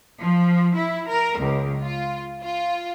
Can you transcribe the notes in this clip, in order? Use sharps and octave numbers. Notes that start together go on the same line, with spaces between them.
F3
E4
A#4
C#2
F4
F4